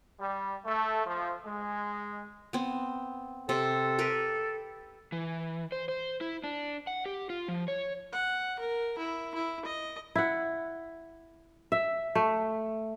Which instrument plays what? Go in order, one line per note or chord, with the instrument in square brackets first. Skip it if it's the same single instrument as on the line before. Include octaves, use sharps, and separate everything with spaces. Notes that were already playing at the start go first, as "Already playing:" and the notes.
[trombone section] G3
A3
F3
G#3
[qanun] B3 C4
[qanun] C3 C4 [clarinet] A4
[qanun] G4 A#4 B4
[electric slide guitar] E3
C5
C5
E4
D4
F#5
G4
F4
F3
C#5
[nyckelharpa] F#5
A#4
E4
E4
D#5
[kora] E4 F#5
E5
A3